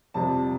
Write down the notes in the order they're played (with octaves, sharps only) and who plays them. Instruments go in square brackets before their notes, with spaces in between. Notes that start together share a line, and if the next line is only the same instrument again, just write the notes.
[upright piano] F2 C3 G3 A5